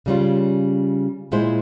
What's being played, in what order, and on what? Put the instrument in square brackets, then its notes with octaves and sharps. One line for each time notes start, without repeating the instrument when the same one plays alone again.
[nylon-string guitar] C#3 G3 C#4 F4
A#2 G#3 E4 G#4 C5